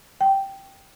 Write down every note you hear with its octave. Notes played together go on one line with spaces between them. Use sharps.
G5